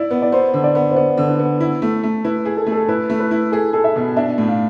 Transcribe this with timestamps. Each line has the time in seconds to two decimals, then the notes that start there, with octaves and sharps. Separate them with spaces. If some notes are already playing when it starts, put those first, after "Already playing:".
Already playing: E4 D5
0.11 B3
0.22 D5
0.32 B3 C5
0.54 D3
0.64 D5
0.75 B3
0.91 C5
0.96 B3 D5
1.17 D3
1.28 B4
1.39 B3
1.61 E4
1.82 A3
2.03 A3
2.25 E4 B4
2.45 G#4
2.57 A4
2.67 A3
2.72 A4
2.88 E4 B4
3.10 A3
3.20 B4
3.31 E4
3.52 G#4 A4
3.73 G#4 A4
3.84 E5
3.96 B2
4.17 D4 E5
4.38 A2
4.48 F5